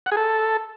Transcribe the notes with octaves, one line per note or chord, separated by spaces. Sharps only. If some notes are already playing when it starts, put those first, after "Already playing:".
F#5
G#4
A4